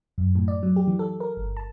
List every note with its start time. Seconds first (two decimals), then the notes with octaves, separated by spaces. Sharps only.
0.18 F#2
0.35 A2
0.48 D5
0.63 F#3
0.76 G4
0.88 E3
0.99 A4
1.20 A#4
1.37 G1
1.57 A5